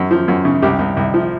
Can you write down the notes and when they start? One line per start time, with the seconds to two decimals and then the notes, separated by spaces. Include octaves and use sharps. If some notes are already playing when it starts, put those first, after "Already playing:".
Already playing: F#2
0.11 F3
0.28 F#2
0.45 C#3
0.62 C2 G4
0.79 C2
0.97 C2
1.14 F3